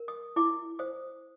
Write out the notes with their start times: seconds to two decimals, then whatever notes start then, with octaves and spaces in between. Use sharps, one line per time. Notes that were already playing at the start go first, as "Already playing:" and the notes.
Already playing: A#4
0.08 D#6
0.36 E4 D6
0.79 C5 D#6